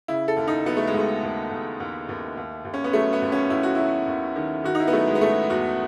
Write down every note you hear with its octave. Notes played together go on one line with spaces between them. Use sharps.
C#3 E4
A4
D#2
D#4
F#3 B3
A3
G#3
D#2 A3
D#2
D#2
D#2
D#2
D#2
D#2
C#4
B3
F#3 A3
B3
D#2
C#4
D#2 E4
F#4
F#3 E4
D#2
D#3
D#3 F#4
D#4
E4
B3
F#3 A3
G#3
B3
F#3 A3
E2 F#4